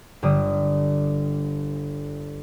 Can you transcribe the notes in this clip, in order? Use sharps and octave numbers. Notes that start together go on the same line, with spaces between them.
G1 D3 G3 D#6